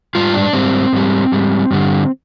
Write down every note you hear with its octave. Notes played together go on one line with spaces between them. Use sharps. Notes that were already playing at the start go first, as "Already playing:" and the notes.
G#2 G3 F4
D4
G#2 G3 C4
G#2 G3
G#2 G3
G2 D3 G3